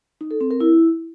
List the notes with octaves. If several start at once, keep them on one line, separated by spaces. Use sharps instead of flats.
D#4
A4
C4
A#4
E4